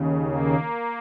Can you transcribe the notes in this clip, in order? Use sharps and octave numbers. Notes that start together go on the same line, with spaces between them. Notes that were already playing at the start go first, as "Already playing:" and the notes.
Already playing: D#2 C#3
A#3